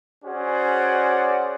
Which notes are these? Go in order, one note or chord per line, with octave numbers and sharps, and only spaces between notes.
C#4 F#4 G#4 C5 D5 F#5